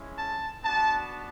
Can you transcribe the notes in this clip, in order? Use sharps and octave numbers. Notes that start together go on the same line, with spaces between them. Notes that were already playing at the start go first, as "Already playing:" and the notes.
Already playing: G#3 C#4 E4
A5
B3 D4 F#4 A5